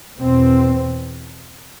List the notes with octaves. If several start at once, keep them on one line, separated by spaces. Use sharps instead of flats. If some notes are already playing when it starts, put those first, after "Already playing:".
E2 B2 C4